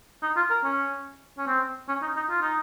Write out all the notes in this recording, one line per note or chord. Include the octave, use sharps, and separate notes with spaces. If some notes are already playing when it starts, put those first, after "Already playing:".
D#4
F4
A#4
C#4
C#4
C4
C#4
D#4
D#4
F4
D#4